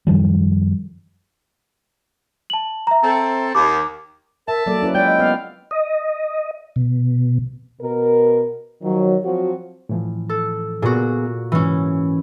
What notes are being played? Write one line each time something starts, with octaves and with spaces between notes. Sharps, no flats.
F#2 D#3 F3 G3
A5 F#7
E5 A#5
C4 A4
D#2 D6
A#4 E5 A5
F#3 A#3 A4 D5
C#4 E4 B4
G#3 F4 D5 G5
D#5
B3 F5
D#5
B2
B2 A#4
D#3 F3 F#3
F3 F#3 C4 F#4
A2 E3 F3
A4
A#2 B3 F4 F#4 G#4
G#2 E3 C#4